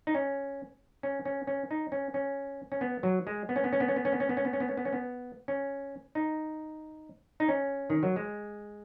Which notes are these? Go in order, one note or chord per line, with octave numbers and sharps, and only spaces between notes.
D#4
C#4
C#4
C#4
C#4
D#4
C#4
C#4
C#4
B3
F#3
G#3
B3
C#4
B3
C#4
B3
C#4
B3
C#4
B3
C#4
B3
C#4
B3
C#4
B3
C#4
B3
C#4
B3
C#4
D#4
D#4
C#4
D#3
F#3
G#3